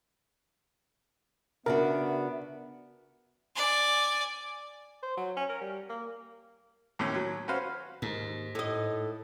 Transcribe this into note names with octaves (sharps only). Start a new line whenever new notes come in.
C#3 B3 D4 F#4 A#4 E5
D5 G#5
C5
F#3
C#4
A#4
G3
A#3
D#2 A2 C#4
F#3
C#4 F#4 B4 C5 F5
D#2 G#2
A2 D#5